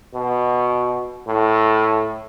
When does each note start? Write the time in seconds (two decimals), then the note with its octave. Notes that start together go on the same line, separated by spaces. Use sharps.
0.14 B2
1.27 A2